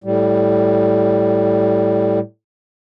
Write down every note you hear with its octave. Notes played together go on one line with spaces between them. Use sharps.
A2 G3